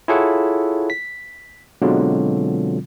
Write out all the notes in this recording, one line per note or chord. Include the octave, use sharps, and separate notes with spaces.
E4 F4 G#4 A4 C#5 F#5
B6
B2 D3 F#3 G#3 C4 F4